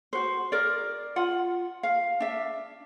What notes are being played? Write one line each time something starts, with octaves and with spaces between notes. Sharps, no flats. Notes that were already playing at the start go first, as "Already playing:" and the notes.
F#4 C5
A#4 D5
F4 F#5
F5
D4 E5